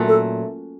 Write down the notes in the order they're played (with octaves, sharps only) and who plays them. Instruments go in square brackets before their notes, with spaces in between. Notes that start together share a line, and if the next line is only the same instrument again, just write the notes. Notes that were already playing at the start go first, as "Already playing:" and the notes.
Already playing: [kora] A#2 F#3 A3 C#4
[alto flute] A4